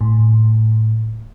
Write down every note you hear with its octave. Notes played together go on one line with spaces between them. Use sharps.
A2